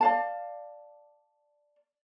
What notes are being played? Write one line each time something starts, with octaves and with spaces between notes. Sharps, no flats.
D5 F5 A5